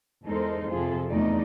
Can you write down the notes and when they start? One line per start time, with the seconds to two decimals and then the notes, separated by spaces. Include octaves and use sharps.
0.25 E2 G#3 D#4 A4 A#4 C5
0.71 F2 C3 F4 G#4 A4
1.09 E2 A3 D#4 D5